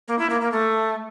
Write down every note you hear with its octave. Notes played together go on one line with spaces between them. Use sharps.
A#3
E4
A#3
A#3
A3